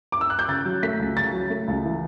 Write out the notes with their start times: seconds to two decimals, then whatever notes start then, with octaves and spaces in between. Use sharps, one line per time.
0.12 D6
0.21 E6
0.30 F#6
0.39 G6
0.48 C#3 A6
0.66 F#3
0.83 A3 B6
0.99 C#2
1.17 C#3 A6
1.33 F#3
1.50 A3
1.68 C#2
1.85 E3